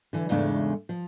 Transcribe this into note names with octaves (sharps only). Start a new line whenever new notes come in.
D3 E3
E2 G#2 C#3 G#3 A3 D4
F3